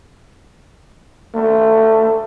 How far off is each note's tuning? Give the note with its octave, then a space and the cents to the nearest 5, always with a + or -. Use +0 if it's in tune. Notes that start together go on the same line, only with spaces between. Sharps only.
A3 +15